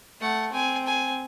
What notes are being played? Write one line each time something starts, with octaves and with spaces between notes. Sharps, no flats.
A3 F#5
C4 G#5
G#5